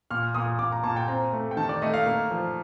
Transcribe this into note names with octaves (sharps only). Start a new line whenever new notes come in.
A#2 F6
A#2 D#6
A#2 D6
A#5
A#2 A5
G5
C4 A#5
A3
G5
D#3 A5
D5
A3 D#5
F5
A#3
F3